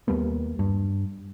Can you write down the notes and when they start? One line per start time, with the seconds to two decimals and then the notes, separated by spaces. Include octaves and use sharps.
0.08 D#2 G3 A#3 B3
0.59 G2